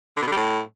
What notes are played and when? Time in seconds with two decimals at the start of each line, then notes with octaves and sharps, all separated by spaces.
0.17 D3
0.22 B2
0.27 D3
0.32 G3
0.37 A2